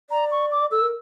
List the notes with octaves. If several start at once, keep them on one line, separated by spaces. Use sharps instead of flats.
D5 A#5
C#6
D6
A4 E6
A#4